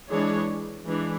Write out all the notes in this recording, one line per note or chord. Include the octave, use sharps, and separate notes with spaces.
E3 G#3 D4 G#4 C#5
E3 G#3 D4